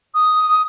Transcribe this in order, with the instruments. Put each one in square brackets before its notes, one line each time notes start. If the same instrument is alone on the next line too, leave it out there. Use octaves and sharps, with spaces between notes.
[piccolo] D#6